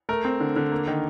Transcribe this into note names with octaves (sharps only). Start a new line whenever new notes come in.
A3 A#4
C4
D3
D3
A#3
D#3